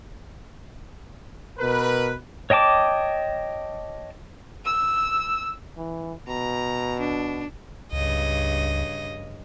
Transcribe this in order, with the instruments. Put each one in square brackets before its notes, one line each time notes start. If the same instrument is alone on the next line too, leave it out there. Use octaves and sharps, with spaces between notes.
[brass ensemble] B2 A#4 B4
[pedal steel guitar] C#5 D#5 G5 A5 D6
[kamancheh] E6
[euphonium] E3
[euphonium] B2 [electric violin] A#5
[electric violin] D4
[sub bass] C#2 [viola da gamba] G2 C#3 D#5